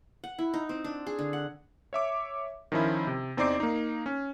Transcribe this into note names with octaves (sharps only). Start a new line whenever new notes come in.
F#5
E4
D#4
C4
D4
G#4
D3
F#5
C#5 E5 D6
D#3 F3 C#4 E4
C3
E2 C4 D#4 D5 D6 C7
A#3 D#4
C#4